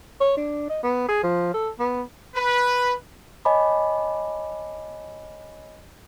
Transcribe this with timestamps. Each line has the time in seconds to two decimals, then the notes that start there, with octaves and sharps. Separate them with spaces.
0.20 C#5
0.37 D4
0.70 D#5
0.83 B3
1.08 G#4
1.23 F3
1.54 A4
1.80 B3
2.35 B4
3.45 C#5 D#5 G#5 A5 B5 D6